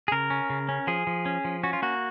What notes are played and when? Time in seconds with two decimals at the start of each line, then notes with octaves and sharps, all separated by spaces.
0.08 G#4
0.12 C#3 A#4
0.30 C#4
0.50 C#3
0.69 C#4
0.87 F3 G#4
1.07 F3
1.26 C#4
1.45 F3
1.63 C#4 F#4
1.73 F4
1.82 A#3 F#4